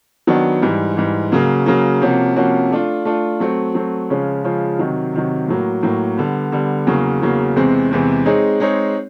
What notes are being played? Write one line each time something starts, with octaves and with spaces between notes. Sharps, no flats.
D#3 F#3 B3 D4
G#2 E3 G3
G#2 E3 G3
C#3 F#3 A#3
C#3 F#3 A#3
C3 F3 A#3 C#4 F#4
C3 F3 A#3 C#4 F#4
A3 D4 F4
A3 D4 F4
F#3 A3 C4
F#3 A3 C4
C#3 F3 G#3 C#4 F4
C#3 F3 G#3 C#4 F4
C3 D#3 F#3
C3 D#3 F#3
A2 F#3 A#3
A2 F#3 A#3
D3 G3 B3
D3 G3 B3
E2 C#3 F#3 A#3
E2 C#3 F#3 A#3
E2 C3 E3 G#3 C4
E2 C3 E3 G#3 C4
G#3 C4 D#4 G#4 C#5
G#3 C4 D#4 G#4 C#5